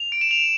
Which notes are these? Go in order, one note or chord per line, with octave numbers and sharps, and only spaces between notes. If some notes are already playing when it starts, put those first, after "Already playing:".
Already playing: F7
D7
E7
F7